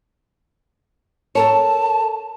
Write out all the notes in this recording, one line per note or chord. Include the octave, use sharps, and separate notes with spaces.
A4 A#4 C#5 A5